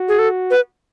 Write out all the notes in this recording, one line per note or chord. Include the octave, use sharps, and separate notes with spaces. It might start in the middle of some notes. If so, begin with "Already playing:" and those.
Already playing: F#4
G#4
A4
B4